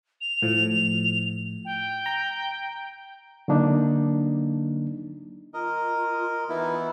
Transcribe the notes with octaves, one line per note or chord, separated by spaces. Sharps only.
F7
A2 F3
G5
A#5
D3 F#3 A#3 D4 D#4
F4 A#4 D#5
E3 B3 D#4 E4